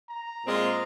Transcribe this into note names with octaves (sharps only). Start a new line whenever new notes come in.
A#5
A#2 G#3 C4 F4